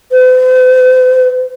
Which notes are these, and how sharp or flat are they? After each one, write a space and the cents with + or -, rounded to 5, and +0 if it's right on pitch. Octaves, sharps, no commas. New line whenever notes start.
C5 -45